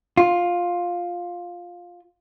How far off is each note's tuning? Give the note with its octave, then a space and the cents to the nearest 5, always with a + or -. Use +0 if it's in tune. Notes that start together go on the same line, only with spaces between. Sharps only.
F4 +10